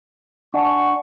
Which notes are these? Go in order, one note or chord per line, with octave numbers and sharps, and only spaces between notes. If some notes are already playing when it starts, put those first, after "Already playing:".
D4 F#5 G#5 C#6